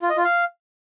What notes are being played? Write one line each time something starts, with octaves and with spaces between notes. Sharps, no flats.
F4
D#5
F4
F5